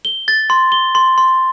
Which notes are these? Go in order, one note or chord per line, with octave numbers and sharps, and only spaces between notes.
G7
A6
C6
G7
C6
C6